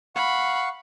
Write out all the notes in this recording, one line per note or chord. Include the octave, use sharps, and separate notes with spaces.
F5 F#5 B5 C#6